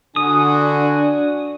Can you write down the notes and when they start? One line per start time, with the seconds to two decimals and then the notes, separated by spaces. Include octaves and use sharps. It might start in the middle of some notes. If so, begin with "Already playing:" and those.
0.16 D3 D4 F#4 G#5 D#6